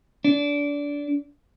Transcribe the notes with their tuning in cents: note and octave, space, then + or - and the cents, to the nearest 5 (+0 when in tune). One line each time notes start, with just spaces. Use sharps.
D4 -25